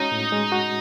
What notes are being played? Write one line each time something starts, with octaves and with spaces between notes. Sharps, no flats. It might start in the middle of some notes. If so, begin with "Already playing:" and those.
Already playing: G#3 C#4 D#4 F#4
A2
G#3
F#4